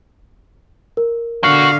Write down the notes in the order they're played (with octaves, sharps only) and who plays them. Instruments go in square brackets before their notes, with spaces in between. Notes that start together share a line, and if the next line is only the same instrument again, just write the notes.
[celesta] A#4
[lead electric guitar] B2 F#4 [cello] D3 [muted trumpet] F5